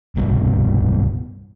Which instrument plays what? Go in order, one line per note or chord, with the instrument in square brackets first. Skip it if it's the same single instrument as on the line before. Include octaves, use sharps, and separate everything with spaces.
[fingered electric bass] D1 C2 G2 B2